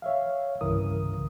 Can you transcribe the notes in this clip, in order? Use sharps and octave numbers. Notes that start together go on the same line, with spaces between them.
C#5 E5 F5
C2 G2 C#3 E3 A#4 D#6